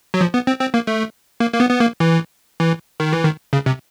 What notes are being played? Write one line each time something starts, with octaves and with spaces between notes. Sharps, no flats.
F#3
F3
B3
C4
C4
A#3
A3
A#3
A#3
B3
B3
A#3
E3
E3
D#3
E3
D#3
C#3
C3